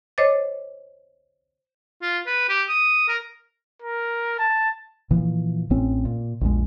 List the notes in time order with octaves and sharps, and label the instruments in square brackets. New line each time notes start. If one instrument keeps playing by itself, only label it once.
[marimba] C5 C#5 D#5 D6 A6
[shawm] F4
B4
G4
D#6
A#4
[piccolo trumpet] A#4
A5
[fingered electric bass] A#2 E3 F3
A1 A2 C4 C#4
A#2
A#1 E2 A#2 G#3